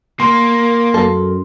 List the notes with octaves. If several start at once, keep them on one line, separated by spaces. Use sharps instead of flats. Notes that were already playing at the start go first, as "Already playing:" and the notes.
A#3 A#4 C6
F#2 A4